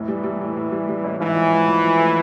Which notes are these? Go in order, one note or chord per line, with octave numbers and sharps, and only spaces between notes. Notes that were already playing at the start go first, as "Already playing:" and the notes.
Already playing: F1 A2 E3
G3
G3
A2
A2
G3
G3
A1
G#2 E3
F3
G#2
F3
F3
A3